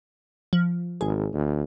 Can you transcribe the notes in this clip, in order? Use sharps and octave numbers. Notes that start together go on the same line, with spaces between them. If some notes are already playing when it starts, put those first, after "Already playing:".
F3
G#1 G#4
D2